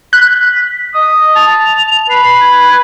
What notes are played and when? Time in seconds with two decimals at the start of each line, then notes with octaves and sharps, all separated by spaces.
0.13 F#6 B6
0.94 D#5 D#6
1.36 A5 F7
2.10 B4 C7
2.41 G#6